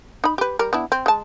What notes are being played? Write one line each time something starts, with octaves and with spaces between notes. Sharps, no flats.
D#4 B5
G4 B4
G3 A#4
B3 D4 E4
C4
G#3 A5